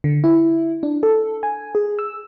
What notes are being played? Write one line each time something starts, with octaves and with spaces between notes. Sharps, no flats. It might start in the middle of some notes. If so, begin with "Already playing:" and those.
D3
E4
D4
A4
G#5
G#4
E6